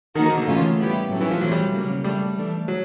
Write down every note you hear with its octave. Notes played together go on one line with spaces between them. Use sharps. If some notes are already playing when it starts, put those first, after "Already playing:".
D#3 F3 A#3 D#4 F#4
D#3
D3
A2 C#3 E3 A3 C#4 F4
G3 B3 E4 G4
A2 F#3 A3 C#4
E3
F3
E3 F#3 A3 C4
G3
C#3 F#3 A#3
F3 G3 A3 D4
E3 A3 D4
F#3